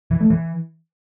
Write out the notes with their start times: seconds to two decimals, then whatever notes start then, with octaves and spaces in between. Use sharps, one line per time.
0.11 E3
0.21 A3
0.30 E3